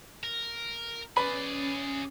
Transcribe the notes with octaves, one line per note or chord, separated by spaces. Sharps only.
A#4
C#4 G#4 B4 D5 B5